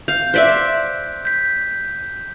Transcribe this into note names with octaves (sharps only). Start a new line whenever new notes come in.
F5 G6
C5 D5 E5 F#6 B6 D7
G6 B6